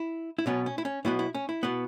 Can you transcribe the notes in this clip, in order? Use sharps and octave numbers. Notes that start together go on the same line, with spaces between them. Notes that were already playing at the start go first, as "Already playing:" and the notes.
Already playing: E4
E4
B1 B2 B3 C#4
C#4
E4
C#4
B1 B2 B3 E4
E4
C#4
E4
B2 B3